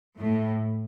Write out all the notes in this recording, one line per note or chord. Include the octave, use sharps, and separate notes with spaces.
A2